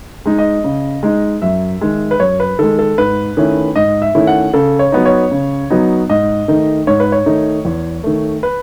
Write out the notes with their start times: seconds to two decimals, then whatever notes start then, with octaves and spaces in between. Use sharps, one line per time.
0.26 G#3 D#4
0.38 D#5
0.64 C#3
1.03 G#3 D#4
1.42 F#2 E5
1.81 D#3 G#3
2.11 B4
2.20 F#2 C#5
2.40 B4
2.59 D#3 G#3 A4
2.79 A4
2.98 G#2 B4
3.37 D#3 A3 C#4 E4
3.76 G#2 D#5
4.02 E5
4.15 D#3 A3 C#4 E4
4.27 F#5
4.54 C#3 A4
4.79 C#5
4.92 F#3 B3 D#4
5.05 C#5
5.32 C#3
5.70 F#3 B3 D#4
6.09 G#2 D#5
6.48 D#3 A3 D#4
6.87 G#2 C#5
7.00 B4
7.12 C#5
7.26 D#3 A3 D#4
7.65 E2
8.04 D#3 A3
8.43 B4